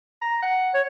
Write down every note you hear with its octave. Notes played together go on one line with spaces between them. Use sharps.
A#5
F#5
C#5